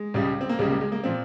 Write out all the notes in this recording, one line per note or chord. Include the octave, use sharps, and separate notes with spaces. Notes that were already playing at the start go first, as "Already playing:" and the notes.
Already playing: G#3
C#2 C#3 G3
C4
A#3
C#2 C#3 G3 G#3
A#3
G#3
A#3
A#2 F3 C4